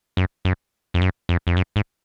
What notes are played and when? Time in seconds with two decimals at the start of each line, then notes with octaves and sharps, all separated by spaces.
0.17 F#2
0.45 F#2
0.94 F2
1.01 F#2
1.29 F2
1.47 F2
1.57 F#2
1.76 G#2